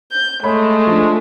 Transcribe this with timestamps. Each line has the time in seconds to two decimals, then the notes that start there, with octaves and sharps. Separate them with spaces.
0.12 G6
0.43 G#3 A3 C#5 B5
0.87 F3 D4